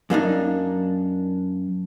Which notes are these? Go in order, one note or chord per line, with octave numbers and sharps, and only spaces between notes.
F#2 A#3 D4 D#4